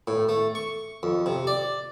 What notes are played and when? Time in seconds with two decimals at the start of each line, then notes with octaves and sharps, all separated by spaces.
0.08 A2
0.29 A3
0.55 C#6
1.03 F2
1.26 C3
1.47 D5